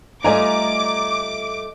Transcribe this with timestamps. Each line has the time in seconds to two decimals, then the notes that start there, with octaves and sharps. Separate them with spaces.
0.24 G3 A3 F4 D5 D#5 G#5 A#5 D6